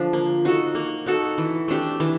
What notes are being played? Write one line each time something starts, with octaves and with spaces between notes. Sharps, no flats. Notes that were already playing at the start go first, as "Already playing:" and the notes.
Already playing: D3 F3 D4
A#3
D#4 F#4 A4
A#3
D#4 F#4 A4
E3
A3 D4 G4
E3